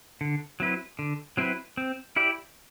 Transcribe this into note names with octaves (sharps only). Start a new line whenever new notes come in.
D3
F#3 C4 E4 B4
D3
F#3 C4 E4 B4
C4
E4 G4 D5